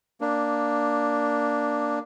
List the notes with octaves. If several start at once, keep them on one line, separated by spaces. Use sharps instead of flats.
A#3 D4